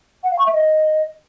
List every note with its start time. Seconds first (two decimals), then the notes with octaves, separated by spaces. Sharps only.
0.24 F#5
0.31 F5
0.39 C#6
0.46 E5
0.53 D#5